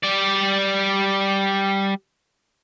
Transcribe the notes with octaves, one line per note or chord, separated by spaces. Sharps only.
G3 D5